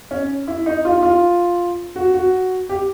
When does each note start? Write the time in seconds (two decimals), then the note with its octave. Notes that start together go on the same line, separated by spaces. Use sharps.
0.11 C#4
0.48 E4
0.66 D#4
0.85 F4
1.03 F4
1.96 F#4
2.14 F#4
2.69 G4